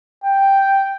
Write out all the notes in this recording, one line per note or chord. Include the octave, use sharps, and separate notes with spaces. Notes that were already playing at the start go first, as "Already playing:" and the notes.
G5